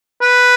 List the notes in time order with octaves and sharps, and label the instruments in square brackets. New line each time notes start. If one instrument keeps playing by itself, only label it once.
[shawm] B4